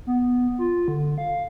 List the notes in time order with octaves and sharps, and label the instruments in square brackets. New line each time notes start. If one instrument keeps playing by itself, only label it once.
[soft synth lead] B3
F4
D3
F5